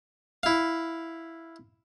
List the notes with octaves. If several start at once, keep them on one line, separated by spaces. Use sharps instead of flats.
E4 F5